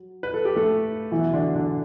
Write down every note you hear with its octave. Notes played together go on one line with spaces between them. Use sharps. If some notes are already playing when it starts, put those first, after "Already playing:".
Already playing: F#3
B4
A4
G4
A3 A4
B2 E3 F#3 E4
D3 D4
D3 D4